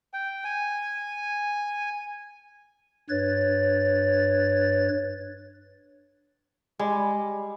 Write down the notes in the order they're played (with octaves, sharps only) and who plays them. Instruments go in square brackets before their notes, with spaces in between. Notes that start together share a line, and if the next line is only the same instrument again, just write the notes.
[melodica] G5
G#5
[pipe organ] G2 B4 C#5 A6
[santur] G3 [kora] G#3